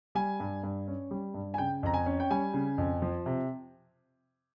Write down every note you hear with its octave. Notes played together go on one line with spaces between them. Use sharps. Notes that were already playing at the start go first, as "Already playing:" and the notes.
G3 G#5
G2
G2
C#4
G3
G2
G#5
C#3 G5
F2 A#5
G#5
C#4
G5
G3 G#5
C#3
F2
F3
C3